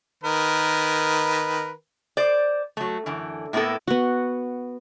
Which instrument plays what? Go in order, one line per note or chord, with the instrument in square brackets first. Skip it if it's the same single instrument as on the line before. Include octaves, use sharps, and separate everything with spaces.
[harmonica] D#3 A#4 B4
[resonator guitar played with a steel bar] C5 D5
F#3 A3
F#2 D3 E3
A2 A#3 B3 E4 A4
[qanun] B3 F#4